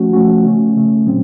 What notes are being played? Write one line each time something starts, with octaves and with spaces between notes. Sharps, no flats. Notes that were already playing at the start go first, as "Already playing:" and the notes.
Already playing: F3 A3 C#4 F#4
F3 A3 C#4 F#4
C#3 A3 C#4
C#3 A3 C#4
A#2 F#3 C4